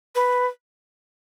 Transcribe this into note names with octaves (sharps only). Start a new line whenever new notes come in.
B4